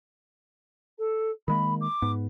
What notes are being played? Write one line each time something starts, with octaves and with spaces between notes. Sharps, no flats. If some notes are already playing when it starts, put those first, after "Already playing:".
A4
D#3 G#3 A#3 B5
D6
G#2 B3